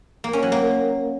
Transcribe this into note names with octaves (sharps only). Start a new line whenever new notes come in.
A#3
C#4
F#3
A#3